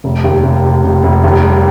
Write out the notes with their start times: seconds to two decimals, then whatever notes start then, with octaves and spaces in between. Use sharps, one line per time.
0.04 F1
0.24 D#2
0.43 F1
0.64 F1
0.84 F1
1.03 F1
1.23 D#2
1.43 G3